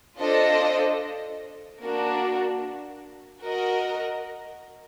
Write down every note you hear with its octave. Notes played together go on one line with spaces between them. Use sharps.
D4 F4 A4 C5 D#5
A#3 D4 F#4 A#4
F#4 A#4 D#5